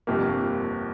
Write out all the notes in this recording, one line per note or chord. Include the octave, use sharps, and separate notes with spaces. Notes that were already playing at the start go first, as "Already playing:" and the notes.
G1 F2 C3 A#3 G4